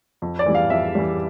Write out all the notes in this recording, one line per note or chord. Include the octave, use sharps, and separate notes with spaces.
F2
D5
E3 G3
F5
F2 E5
E3 G3